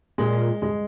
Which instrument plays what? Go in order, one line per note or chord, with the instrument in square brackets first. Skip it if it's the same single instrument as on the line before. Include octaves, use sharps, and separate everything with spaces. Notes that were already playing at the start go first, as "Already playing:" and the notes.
[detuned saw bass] A#2 [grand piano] G#3
[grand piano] G#3